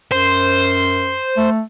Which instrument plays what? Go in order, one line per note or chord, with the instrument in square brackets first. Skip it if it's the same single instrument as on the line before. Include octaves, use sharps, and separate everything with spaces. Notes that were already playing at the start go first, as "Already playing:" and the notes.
[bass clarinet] F#2 [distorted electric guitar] C5
[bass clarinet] A3